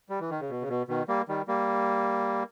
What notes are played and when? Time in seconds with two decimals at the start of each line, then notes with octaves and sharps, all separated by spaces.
0.09 G3
0.20 E3
0.30 D#3
0.40 C#3
0.50 B2
0.61 C#3
0.69 B2
0.88 B2 D#3
1.08 G3 A#3
1.28 D#3 G3
1.48 G3 A#3